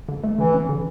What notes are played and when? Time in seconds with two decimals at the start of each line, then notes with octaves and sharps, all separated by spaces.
0.09 D3
0.24 A3
0.39 D3 E3
0.54 C#4
0.69 D3